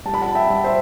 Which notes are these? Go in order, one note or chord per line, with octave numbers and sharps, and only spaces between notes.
G3 A5
B5
F#5 A5
E5 G5
G3
C5 E5